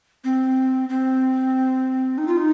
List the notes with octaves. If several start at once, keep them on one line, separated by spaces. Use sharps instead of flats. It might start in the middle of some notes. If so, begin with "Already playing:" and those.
C4
C4
D#4
F4
D#4